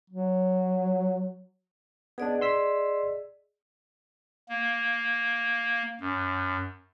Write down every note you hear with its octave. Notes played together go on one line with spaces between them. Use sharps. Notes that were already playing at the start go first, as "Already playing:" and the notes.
F#3
B3 D4 G#4 D5 D#5
C6 E6 B6
A#3
F#2